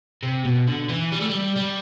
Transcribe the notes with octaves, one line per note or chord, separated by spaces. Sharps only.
C3
B2
D3
E3
G3
A3
G3
G3